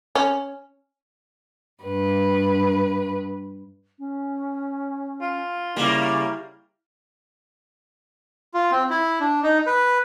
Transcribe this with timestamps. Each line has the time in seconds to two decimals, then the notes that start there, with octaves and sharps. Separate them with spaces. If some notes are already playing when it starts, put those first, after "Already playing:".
0.15 C#4
1.84 G2 B4
3.99 C#4
5.21 F4
5.76 C#3 G3 A#3 E4
8.54 F4
8.71 C4
8.90 E4
9.20 D4
9.44 D#4
9.67 B4